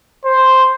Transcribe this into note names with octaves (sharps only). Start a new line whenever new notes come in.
C5